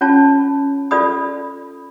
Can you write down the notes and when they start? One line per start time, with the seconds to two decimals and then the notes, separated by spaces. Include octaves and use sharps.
0.01 C#4 F4 C#5 A5
0.91 F4 A4 D5 B5 D#6